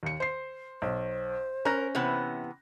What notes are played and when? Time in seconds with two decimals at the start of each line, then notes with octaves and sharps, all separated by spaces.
0.03 D#2 C#7
0.20 C5 C7
0.82 B1 C5
1.65 C#4 A#4 F#6 A#6
1.95 C3 E3 B3